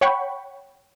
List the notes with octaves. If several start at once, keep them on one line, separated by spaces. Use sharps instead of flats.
C#5 F#5 G5 B5 C#6